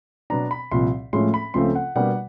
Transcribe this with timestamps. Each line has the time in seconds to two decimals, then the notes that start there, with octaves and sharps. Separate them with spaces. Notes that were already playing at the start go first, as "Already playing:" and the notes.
0.30 B2 F#3 B3 D4 A#5
0.51 B5
0.71 C2 A#2 F3 C6
1.13 A2 F3 G#3 C#4 C6
1.34 B5
1.54 C#2 C#3 F3 A3 C4 C6
1.75 F#5
1.95 B2 G3 A#3 D4 F#5